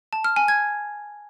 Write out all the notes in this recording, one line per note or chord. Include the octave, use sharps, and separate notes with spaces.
A5
F6
G#5
G#6